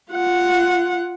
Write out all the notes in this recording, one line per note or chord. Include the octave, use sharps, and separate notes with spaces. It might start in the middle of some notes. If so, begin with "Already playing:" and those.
F4 F#5